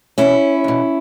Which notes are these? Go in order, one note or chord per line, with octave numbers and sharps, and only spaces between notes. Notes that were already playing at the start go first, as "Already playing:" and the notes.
E2 B2 C#4 E4
E2 B2